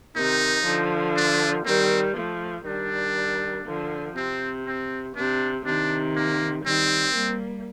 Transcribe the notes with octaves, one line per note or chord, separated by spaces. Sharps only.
C3 D#3 D#4
D3 F3
D4
D#3 G3 C4
F3 A3
D#3 G3 D4
D3 F3
C3 C4
C4
C3 D4
C3 D#3 D4
A#3
D#3 G3 C4
G3 A#3